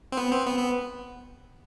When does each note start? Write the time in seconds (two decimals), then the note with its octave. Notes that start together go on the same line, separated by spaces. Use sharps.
0.12 C4
0.17 B3
0.31 C4
0.46 B3
0.59 B3